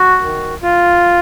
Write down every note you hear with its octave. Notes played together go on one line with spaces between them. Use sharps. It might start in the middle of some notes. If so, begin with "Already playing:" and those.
Already playing: F#4
D#3
F4